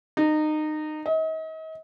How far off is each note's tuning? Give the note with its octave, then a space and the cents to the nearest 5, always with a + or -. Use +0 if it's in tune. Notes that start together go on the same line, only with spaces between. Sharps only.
D#4 -25
D#5 +40